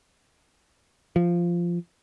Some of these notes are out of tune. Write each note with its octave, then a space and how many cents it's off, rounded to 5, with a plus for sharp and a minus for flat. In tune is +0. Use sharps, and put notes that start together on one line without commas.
F3 -10